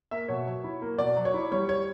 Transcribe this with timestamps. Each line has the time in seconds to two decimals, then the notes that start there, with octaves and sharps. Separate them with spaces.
0.11 A#3 E5
0.28 B2 C#5
0.46 F#3
0.64 E4
0.82 A#3
0.98 B2 D5
1.16 F#3
1.25 C#5
1.34 E4
1.52 G3 C#5
1.69 C#5